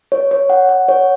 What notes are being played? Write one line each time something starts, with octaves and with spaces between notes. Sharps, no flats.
C#5
C#5
F#5
F#5
C#5